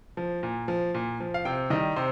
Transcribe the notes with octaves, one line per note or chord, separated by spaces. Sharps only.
F3
A#2
F3
A#2
F3
F5
C3 G5
D#3 G3 D#5
C3 C5